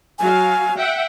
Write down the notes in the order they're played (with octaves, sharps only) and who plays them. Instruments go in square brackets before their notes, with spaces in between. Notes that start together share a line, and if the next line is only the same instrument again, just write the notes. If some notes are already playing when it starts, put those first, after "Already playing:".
[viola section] F#3 F#4 F5 [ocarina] G#5
[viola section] E5 F#5 G5